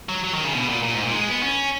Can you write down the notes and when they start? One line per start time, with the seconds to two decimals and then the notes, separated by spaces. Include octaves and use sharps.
0.09 F#3
0.24 F#3
0.34 D#3
0.44 C#3
0.54 B2
0.69 A#2
0.83 A#2
0.93 G#2
1.04 A#2
1.13 G#3
1.28 B3
1.43 C#4